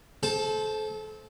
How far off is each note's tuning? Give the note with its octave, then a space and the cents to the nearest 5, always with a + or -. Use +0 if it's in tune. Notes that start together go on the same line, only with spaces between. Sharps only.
A4 -30 C5 +0 A5 +0